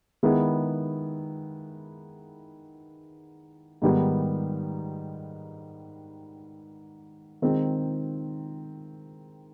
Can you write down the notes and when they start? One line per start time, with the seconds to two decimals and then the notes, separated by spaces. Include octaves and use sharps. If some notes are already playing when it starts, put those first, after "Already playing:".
0.23 D#3 G#3 B3 E4
3.82 G#2 D#3 G3 B3 D#4
7.42 D#3 G#3 C4